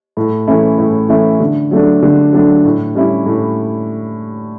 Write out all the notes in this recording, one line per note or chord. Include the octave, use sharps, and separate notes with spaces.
A2
E3 A3 C#4 E4
A2
E3 A3 C#4 E4
D3
F#3 A3 D4
D3
F#3 A3 D4
A2
G3 C#4 E4
A2